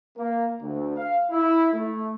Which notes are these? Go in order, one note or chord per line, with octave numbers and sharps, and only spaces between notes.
A#3
D2
F5
E4
A3